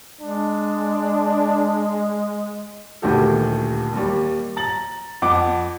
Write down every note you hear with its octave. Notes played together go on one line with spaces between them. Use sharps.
G#3 D4
D#1 D2 D#3 F#4 G4 A4
D#2 G3
A#5 A6 F#7
F2 F#5 D6